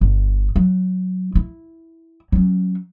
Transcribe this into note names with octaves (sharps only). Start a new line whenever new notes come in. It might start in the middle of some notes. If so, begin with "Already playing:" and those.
G1
F#3
E4
F#3 C#4